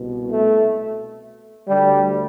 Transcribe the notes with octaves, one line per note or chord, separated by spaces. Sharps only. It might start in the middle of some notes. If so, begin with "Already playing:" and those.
Already playing: C2 B2
A3
D2 D3 G3